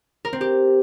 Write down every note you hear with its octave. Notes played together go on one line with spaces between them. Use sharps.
A#4
C4
G4